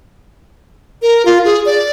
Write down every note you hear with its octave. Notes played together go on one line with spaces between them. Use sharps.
A#4
F4
G#4
D5